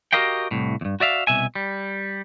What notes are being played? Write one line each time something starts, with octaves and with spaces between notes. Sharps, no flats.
F#4 G4 A#4 D#5 F5 G5
C2 A2
E2 G2
F#4 D5 E5 F5
C2 B2 E5 G#5
G3